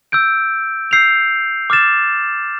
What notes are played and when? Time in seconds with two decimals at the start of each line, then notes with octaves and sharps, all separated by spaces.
0.12 E6 G6 D7
0.91 E6 G6 C7 F7
1.70 D6 F6 A6 E7